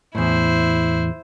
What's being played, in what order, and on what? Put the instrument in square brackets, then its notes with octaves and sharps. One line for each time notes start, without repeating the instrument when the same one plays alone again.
[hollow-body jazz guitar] E2 A2 [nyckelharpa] E4 C5